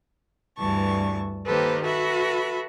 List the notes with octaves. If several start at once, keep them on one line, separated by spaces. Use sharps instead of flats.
D2 G2 E3 A5 C#6
D#3 A#3 G4 A4 B4 C5
F#4 A4 B4 E5 B5